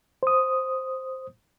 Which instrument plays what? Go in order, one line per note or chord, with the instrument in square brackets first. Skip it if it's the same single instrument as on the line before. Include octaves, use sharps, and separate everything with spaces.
[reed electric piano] C5 D#6